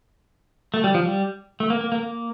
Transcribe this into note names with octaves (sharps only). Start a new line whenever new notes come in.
A3
G3
F3
G3
A3
A#3
A#3
A#3
A#3